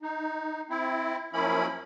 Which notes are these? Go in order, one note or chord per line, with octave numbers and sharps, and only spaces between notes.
D#4
C4 E4
F#2 F3 A#3 C#4 E4 B5